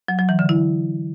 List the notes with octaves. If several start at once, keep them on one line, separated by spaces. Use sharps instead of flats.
F#3
F#3
E3
D3
E4